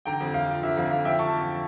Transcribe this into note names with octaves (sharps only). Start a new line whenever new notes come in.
D3 G5 A#5
F2
F2 F5
F3
D3 E5
F2 F5
F2 F5
F3 E5 G5
D3 A5 C#6
F2